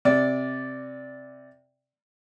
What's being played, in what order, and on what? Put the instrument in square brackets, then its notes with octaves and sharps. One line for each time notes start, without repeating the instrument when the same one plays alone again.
[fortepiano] C3 D5